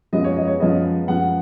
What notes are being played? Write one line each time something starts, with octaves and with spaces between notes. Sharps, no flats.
F#2 F3 G#3 B3 D#5
C#5
D#5
C#5
F#2 F3 G#3 B3 D#5
F#2 F3 G#3 B3 F#5